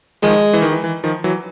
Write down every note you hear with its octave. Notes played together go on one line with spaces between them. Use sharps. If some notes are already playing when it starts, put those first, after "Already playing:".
D#3 F3 G#3
E3
D#3
E3
E3
D#3 F3
E3 F#3